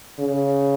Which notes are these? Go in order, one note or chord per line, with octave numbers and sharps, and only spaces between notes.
C#3